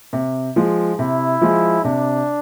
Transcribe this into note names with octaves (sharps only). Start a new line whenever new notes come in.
C3
F3 G#3
C3 E4
F3 G#3
C3 D4